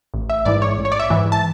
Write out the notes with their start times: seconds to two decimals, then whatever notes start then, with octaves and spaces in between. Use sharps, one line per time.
0.14 A1
0.30 E5
0.45 G#2 E3 D5
0.62 C#5
0.78 A1
0.85 C#5
0.92 D5
0.99 E5
1.10 G#2 E3
1.32 A5